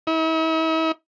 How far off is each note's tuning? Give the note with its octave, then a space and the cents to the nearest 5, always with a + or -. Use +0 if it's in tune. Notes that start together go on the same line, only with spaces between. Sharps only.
E4 -45